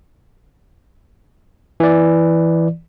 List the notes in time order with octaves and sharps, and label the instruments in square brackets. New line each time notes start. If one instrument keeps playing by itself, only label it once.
[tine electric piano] E3 D5